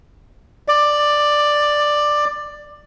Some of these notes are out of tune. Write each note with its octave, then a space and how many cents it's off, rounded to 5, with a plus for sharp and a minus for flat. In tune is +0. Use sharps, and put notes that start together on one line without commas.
D5 +10